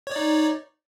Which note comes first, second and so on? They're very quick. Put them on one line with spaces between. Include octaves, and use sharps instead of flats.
C#5 D5 D#4